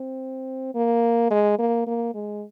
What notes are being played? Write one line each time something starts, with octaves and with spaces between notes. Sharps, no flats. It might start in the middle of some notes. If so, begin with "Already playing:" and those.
Already playing: C4
A#3
G#3
A#3
A#3
G#3